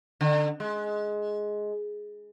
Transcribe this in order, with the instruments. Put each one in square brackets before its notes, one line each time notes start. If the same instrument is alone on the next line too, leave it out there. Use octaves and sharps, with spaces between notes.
[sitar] D3
G#3